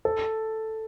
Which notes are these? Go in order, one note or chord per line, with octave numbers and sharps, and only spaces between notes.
A4